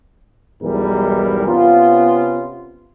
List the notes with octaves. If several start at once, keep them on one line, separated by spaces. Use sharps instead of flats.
B1 E2 G#2 E3 G3 A#4
C3 B3 C#4 F4